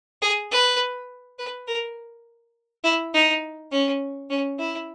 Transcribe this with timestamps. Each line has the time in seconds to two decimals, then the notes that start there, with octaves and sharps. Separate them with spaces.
0.22 G#4
0.51 B4
1.39 B4
1.67 A#4
2.84 E4
3.14 D#4
3.72 C#4
4.30 C#4
4.59 E4